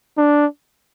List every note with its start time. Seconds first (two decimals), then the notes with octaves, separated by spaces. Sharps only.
0.18 D4